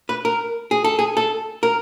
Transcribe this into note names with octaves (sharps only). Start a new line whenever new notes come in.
B4
A#4
G#4
A4
G#4
A4
A#4